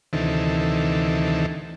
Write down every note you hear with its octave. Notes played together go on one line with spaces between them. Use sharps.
D2 C3 D#3 E3 A4